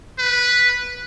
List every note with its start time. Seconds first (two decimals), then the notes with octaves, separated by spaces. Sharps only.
0.19 B4